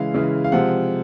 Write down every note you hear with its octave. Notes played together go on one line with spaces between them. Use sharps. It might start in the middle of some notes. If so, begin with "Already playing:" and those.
Already playing: C#3 E3 G#3 F5
C#3 E3 G#3
F5
C3 F3 G#3 F#5